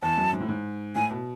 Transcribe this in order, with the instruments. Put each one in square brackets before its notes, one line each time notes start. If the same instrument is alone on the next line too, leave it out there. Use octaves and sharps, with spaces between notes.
[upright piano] E2 [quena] A5
[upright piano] F#2
G#2
A2
G#2
[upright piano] A2 [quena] G#5
[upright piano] B2